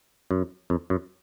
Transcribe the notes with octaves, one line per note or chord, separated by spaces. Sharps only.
F#2
F2
F#2